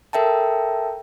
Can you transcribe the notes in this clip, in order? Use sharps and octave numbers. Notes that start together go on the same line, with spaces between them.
A4 A#4 E5 G5 A5